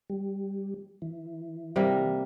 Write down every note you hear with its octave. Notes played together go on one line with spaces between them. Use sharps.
G3
E3
C3 G3 A#3